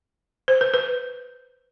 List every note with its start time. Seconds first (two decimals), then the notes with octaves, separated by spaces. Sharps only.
0.48 C5
0.61 B4
0.74 B4